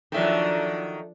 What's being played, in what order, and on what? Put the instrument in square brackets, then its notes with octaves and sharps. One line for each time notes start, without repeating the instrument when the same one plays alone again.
[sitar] D#3 F#3 [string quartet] F3 D4 [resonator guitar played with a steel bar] A4 E5